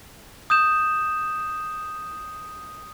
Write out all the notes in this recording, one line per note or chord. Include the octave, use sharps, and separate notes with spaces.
D#6 G6 E7